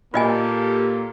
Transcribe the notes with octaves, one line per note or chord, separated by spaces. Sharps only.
A#2 A#3 F4 G4 A4 D#5 G#5